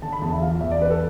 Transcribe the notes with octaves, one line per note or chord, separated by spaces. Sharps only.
D3 A5
B5
E2 A5
E5
F3 F5
E2 E5
D5
E3 B4
A4